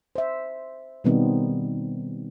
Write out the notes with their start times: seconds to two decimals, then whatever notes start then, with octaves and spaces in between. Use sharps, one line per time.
0.16 C5 E5
1.04 B2 D#3 G3 B3 C4 D#4